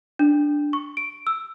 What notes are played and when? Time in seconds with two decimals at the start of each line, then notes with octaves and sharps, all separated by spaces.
0.19 D4
0.73 C#6
0.97 D7
1.27 E6